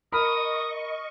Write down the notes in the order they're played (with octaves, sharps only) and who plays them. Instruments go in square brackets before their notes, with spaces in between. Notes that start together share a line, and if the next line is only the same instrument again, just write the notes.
[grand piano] A#4 B5 F6 [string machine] D#5 C#6 [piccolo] D#6